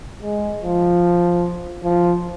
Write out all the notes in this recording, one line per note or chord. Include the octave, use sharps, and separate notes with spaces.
G#3
F3
F3